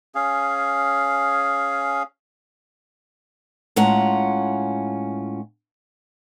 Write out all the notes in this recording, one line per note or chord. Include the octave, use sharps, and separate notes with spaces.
C#4 G#4 F5
A2 G#3 C#4 F4 F#5 A#5